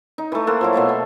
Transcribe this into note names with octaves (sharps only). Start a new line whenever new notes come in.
D#4
E3 A3
A#3 A4 C5 F#5
F3 F#3 E4
B2 A3 F5 C#6
B3